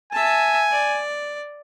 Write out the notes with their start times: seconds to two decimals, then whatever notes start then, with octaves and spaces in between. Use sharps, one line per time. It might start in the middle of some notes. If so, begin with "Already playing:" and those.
0.13 E5 G#5 A5
0.71 D5